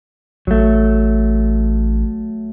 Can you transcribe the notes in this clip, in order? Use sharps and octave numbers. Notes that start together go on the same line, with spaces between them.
A1 F#3 A3